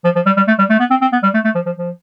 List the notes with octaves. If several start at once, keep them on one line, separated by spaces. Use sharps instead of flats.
F3
F3
G3
G3
A3
G3
A3
B3
C4
C4
B3
G3
A3
A3
F3
F3
F3